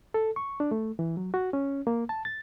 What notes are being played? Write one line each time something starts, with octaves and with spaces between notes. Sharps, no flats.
A4
C#6
D4
A3
E3
F#3
F#4
C#4
A#3
A5
A6